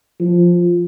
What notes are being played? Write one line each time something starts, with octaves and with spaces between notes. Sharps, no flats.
F3